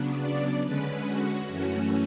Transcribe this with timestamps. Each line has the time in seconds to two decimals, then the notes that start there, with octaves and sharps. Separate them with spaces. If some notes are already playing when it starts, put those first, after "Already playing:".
Already playing: C#3 F#3 B3 D4
0.22 D5
0.65 D3 G#3 C#4 B4
1.06 F#4
1.49 F#2 E3 A3 C#4 F#4